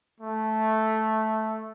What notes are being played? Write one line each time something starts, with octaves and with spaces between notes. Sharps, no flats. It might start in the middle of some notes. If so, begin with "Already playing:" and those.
A3